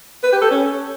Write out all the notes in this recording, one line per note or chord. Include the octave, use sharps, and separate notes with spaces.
B4
G4
A4
C#4